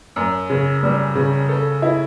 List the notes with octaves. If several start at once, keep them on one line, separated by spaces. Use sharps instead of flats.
F#2
C#3
G3
C#3
A4
E4